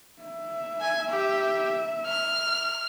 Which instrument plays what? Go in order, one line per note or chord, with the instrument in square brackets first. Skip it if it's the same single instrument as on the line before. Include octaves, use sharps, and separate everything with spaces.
[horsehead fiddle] E5
[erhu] G#5
G4
F6